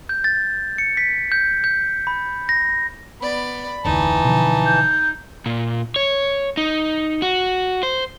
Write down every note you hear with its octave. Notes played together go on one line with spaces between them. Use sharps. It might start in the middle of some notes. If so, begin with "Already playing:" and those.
G6
A6
C#7
B6
G6
G6
B5
A#6
B3 D5 B5
F1 D2 E3 D#4 A5
B2 D3 F3
G6
A#2
C#5
D#4
F#4
C5